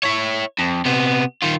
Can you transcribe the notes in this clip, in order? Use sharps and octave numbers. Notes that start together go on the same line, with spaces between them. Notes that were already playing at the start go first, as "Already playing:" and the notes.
E4 C#5
F2
C3 B3
D#3 F4